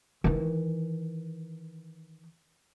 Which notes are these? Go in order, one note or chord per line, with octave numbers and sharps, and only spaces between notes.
D#3 E3